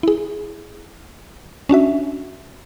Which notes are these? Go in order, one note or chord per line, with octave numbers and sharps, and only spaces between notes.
E4 G#4
C#4 D4 F#4 E5